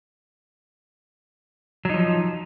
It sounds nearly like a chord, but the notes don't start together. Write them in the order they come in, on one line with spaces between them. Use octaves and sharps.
F#3 D#4 F3